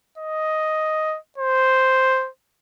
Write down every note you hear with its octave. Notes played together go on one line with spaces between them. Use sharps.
D#5
C5